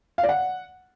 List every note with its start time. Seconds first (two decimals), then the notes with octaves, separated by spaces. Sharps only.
0.18 F5
0.23 D5
0.29 F#5